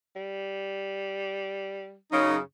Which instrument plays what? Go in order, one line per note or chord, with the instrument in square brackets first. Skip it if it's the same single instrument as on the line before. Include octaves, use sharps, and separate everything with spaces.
[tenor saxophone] G3
[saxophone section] F#2 C#3 [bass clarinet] D#4